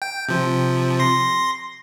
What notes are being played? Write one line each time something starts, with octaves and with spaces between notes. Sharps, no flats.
G5
C3 F3
C6 A#6